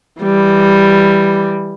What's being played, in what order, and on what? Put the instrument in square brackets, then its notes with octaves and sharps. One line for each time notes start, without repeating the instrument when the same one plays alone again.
[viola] E3 G3